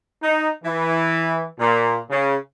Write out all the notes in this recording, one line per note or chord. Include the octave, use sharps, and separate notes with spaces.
D#4
E3
A#2
C#3